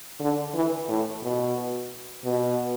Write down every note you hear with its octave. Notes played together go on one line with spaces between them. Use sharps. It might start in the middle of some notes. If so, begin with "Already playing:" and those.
D3
E3
A2
B2
B2